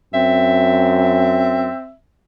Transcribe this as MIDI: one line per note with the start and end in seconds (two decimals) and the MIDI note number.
0.14 1.69 42
0.14 1.91 60
0.14 1.95 76